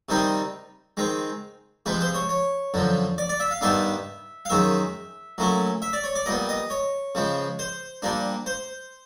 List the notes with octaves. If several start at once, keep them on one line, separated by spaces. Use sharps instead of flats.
C3 D#3 G3 C4 D#4
D#3 G#3 C4
C3 F3 G#3 B4
C5
C#5
C#5
F#2 D3 F3
D5
D5
E5
F5
G2 D#3 G3 B3 D4 E5
F5
F#2 D#3 G#3 C#4 E5
A#2 F#3 A3 C#4 E4
E5
D5
C#5
D5
A#2 G3 B3 D#5
D#5
C#5
C#3 F3 G#3
C5
A#2 G3 A#3 D4
C5